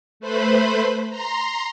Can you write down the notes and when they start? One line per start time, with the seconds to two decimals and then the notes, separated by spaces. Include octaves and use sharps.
0.20 A3 B4 C5 B5
1.09 A#5 C6